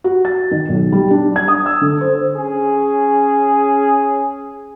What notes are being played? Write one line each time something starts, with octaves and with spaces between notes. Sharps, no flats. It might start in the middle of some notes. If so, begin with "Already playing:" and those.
F#4
A6
D#3
B1
G3
D4
G#6
D#6
E6
D3
C5
C#4 G#4